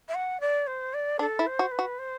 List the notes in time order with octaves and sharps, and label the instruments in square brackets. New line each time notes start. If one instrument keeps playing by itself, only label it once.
[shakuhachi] E5
F#5
D5
C5
D5
[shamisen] D4 [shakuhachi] A4
[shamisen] E4
[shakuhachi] C5
[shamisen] F#4
[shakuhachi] B4
[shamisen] F#4
[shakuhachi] C5